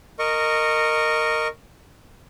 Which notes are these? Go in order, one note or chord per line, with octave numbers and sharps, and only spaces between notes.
A#4 D#5 C#6